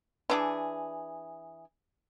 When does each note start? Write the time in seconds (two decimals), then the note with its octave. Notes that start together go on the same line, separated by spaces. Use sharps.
0.30 E3 D4 G#4